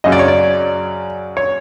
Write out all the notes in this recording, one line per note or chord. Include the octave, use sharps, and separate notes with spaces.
F#2 C#3 F#3 D#5
D5
C#5
D5
C#5